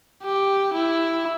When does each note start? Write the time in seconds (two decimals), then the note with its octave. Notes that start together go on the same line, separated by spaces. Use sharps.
0.24 G4
0.74 E4